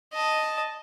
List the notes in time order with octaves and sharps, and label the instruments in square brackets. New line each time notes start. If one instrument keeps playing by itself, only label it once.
[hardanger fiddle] D#5 A5